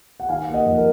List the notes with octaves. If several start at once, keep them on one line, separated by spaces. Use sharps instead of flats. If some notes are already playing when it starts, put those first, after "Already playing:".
F#5
D#3 F5 G#5
A#3
D#5 F#5
F2
A#4